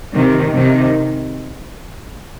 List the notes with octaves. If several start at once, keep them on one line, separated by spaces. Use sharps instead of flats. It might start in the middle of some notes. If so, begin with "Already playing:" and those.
C3 D#3
C3 D#3